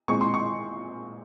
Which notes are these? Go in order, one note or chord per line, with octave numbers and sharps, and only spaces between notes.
A#2 G#3 C4 C#6
C6
C#6